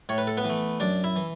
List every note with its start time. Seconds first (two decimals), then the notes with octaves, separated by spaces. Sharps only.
0.09 A2 C#5
0.18 B4
0.27 A4
0.37 B3 B4
0.45 E3 A3
0.80 F#2 D4 D5
1.04 E4 E5
1.16 E3